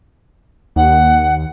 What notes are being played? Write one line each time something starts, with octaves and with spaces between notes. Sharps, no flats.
D#2 F#5